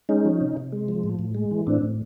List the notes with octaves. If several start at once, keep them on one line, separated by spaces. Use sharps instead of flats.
G#3 C#4 D#4
F3
C3
C3
G#3
F3
A2
A2
G#3
E3
A2 C4 D4
A2